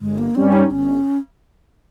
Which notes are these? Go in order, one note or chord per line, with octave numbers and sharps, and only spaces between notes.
G1 G#3
A#3
G2 G3 C4 C#4
D#4
G1 C#4